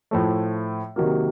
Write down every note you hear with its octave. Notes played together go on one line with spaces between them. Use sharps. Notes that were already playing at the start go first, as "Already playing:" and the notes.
A2 F3 A3
C3 D#3 F#3 A#3